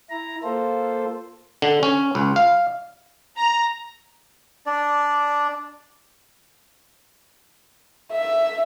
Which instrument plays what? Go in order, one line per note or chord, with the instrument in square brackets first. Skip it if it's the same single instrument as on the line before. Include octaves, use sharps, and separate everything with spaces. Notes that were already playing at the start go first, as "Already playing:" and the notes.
[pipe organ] E4 A#5
A#3 F4 A4 C5
[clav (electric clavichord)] D3
C#4
C#2
F5
[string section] A#5
[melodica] D4 D5
[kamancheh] E5